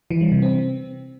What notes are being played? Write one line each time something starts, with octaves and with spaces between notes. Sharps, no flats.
E3
G3
C3
C4